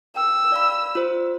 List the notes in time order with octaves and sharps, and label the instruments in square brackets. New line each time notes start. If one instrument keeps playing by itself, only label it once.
[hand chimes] G5 [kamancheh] E6
[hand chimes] D5 F5 B5
F4 C5